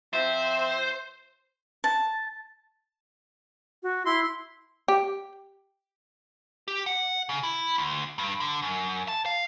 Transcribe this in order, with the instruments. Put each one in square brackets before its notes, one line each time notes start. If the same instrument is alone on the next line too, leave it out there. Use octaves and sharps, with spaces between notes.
[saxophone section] F3 C4 E5 [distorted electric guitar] C5
[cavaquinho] A5
[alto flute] F#4
[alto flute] E4 [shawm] C6
[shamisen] G4
[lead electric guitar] G4
F#5
C#3
E4
D2
G2
D3
F#2
A5
F5